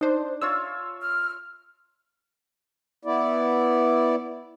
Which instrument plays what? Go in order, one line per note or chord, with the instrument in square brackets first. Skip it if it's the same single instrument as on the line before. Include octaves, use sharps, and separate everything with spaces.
[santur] D4 [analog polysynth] D#4 C5
[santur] F4 C#5 E5 [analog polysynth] E6
[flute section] F6
[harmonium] B3 E4 D5